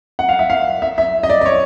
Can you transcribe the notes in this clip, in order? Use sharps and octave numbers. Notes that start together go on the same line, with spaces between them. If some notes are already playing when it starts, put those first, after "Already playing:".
F#5
F5
E5
F5
E5
E5
D#5
D5
D5
C#5